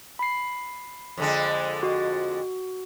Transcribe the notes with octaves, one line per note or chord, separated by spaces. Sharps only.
B5 C7
F2 D3 G#3
F#4